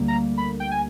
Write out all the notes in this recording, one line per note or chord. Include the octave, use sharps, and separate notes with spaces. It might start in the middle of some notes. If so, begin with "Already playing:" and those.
Already playing: D2 D3 G3 A#3
A#5
B5
G5
G#5